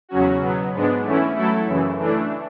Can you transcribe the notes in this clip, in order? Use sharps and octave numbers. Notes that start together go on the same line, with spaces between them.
E2 C#3 F#3 C#4 F#4
B2 F#3 B3
G#2 G#3 B3 D4
E3 A3 C#4 E4
F#3 A3 E4 A4
F#2 C#3 E3
E3 A3 D4